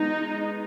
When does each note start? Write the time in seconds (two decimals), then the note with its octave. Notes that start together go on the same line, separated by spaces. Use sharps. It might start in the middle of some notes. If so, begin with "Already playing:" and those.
Already playing: G#3 B3 D#4